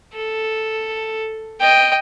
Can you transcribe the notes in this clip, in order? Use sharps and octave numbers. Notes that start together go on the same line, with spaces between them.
A4
D#5 G5